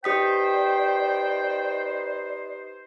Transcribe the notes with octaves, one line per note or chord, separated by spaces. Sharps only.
D#4 G4 B4 C5 D5 G5 D#6 B6